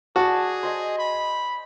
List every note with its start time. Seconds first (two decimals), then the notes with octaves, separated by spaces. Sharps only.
0.16 F#4 G#4 D5 A5
0.63 C5 D#5 G#5
0.98 B5